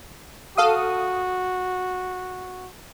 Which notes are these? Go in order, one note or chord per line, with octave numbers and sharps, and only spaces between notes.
F#4 A4 F5 D#6